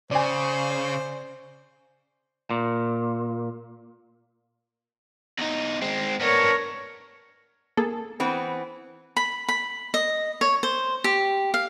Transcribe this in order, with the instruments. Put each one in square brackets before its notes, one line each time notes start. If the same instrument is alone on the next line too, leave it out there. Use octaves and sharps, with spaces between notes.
[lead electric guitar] C#3 [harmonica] C5 [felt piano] D5 G#5
[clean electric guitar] A#2
[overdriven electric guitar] E2 D#4
G#3 C4
[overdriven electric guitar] B3 D4 [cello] A#4 C#5
[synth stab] A#3 G#4 A4
[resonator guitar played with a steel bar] E3 B3 C4
[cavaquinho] B5
B5
D#5
C#5
C5
G4
F5